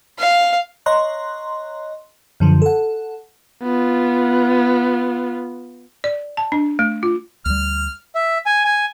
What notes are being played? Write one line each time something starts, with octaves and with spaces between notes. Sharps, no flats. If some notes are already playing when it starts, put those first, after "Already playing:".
F5
C#5 D#5 A#5 C6 F#6
F#2 D3 F3
A4 F#5
B3 F4
D5
A5
D4
A3
F4
D2 G3 F6
E5
G#5
G#5